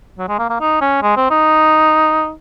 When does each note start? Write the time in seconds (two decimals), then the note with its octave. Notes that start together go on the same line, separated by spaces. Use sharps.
0.18 F#3
0.29 G#3
0.39 A#3
0.50 A#3
0.60 D#4
0.81 C#4
1.03 G#3
1.17 C4
1.31 D#4